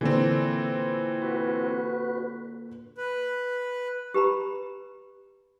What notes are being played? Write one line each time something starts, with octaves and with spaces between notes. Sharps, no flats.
A#2 D3 E3 C4
F#4 B4
B4
G4 B4 A#5 B5